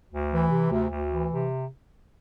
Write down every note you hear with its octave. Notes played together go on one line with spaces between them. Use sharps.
D2
E3
C3
D2
D2
E3
C3